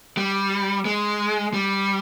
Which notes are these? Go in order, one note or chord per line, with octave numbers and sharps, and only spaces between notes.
G3
G#3
G3